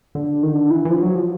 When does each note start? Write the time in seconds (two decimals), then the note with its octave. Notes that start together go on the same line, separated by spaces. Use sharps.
0.15 D3
0.43 D#3
0.53 D3
0.70 E3
0.85 E3
0.90 F3
1.02 F#3
1.15 F3